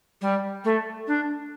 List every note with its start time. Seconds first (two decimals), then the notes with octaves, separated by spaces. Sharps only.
0.21 G3
0.64 A3
1.07 D4